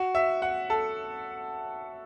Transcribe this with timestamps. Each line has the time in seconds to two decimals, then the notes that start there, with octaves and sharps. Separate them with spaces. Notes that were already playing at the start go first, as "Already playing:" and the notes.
Already playing: F#4
0.15 E5
0.42 F#5
0.70 A4